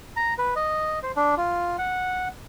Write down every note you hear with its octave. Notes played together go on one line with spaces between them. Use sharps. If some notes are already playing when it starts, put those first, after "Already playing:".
A#5
B4
D#5
C5
D4
F4
F#5